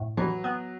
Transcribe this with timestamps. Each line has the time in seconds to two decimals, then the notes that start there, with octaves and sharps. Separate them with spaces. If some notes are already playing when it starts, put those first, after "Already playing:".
Already playing: A2
0.17 E3 F#3
0.44 B3